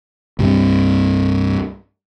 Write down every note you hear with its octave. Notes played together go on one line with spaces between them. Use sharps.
C2 G2 C3